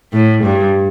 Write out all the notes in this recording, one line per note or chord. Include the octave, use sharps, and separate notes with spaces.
A2
G2